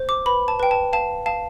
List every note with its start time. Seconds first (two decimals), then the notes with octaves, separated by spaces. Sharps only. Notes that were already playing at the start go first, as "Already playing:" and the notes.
Already playing: C5
0.09 D6
0.26 B4 B5
0.48 A5
0.60 B4 G5
0.71 A5
0.93 F5 A5
1.26 F5 A5